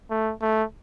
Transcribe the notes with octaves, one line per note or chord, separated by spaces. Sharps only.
A3
A3